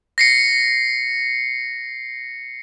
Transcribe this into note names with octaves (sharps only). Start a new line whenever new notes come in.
A#6 C7 C#7